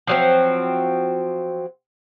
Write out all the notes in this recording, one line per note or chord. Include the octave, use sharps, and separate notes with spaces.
F3 F#3 C4